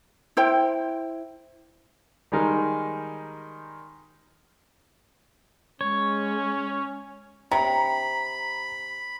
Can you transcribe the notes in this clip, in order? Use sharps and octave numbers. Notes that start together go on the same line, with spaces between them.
E4 C5 G5
D#3 G3 G#3 D#4 A#4
G#3 C#4 C#5
C3 A#5 B5